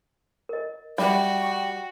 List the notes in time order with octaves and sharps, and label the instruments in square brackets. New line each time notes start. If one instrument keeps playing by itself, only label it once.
[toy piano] A#4 D#5
[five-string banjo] G3 [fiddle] F#4 [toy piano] E5 F#5 [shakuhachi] G5
[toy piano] C#6